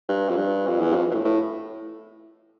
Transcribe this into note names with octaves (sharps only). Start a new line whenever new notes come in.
G2
F2
G2
F2
E2
G2
F2
B2
A2
A2